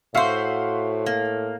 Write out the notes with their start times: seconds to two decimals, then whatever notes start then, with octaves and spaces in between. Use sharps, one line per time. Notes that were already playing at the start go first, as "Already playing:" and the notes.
0.15 A2 F#4 C5 E5 F5
1.06 A#3